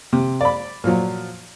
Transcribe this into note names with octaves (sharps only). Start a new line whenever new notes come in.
C3
D5 B5
A#2 F3 F#3